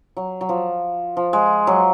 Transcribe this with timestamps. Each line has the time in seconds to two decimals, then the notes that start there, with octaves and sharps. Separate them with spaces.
0.17 F#3
0.41 F#3
0.49 F3
1.17 F3
1.33 G#3
1.67 F#3